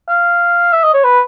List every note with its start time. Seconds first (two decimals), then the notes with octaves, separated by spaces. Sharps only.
0.09 F5
0.73 E5
0.84 D#5
0.94 C#5
1.04 B4